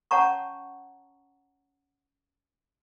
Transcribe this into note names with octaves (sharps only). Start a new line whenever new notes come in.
C#4 C#5 F#5 A5 A#5 C#6